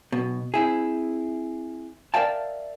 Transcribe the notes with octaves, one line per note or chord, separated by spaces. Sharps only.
B1 B2
C4 E4 G#4
A#4 D5 E5 F5 G5 A5